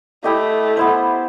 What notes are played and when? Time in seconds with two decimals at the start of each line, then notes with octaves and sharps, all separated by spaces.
0.24 A3 E4 G4 D#5
0.77 B3 E4 C5